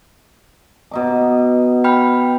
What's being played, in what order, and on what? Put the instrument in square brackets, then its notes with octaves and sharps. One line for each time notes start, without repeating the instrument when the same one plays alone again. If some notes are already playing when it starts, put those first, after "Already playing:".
[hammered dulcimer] B2 D#4 D6
[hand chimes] G5 B5 F6